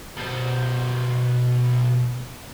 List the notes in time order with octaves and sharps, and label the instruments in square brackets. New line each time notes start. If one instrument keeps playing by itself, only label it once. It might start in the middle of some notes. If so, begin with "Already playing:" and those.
[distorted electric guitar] B2 C5